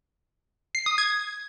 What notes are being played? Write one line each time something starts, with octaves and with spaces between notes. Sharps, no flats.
C7
D#6
G#6